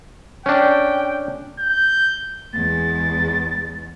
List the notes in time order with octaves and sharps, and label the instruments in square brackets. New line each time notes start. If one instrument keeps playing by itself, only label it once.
[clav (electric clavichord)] C#4 D4 [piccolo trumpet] G5
[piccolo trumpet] G6
[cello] E2 G#3 [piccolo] A6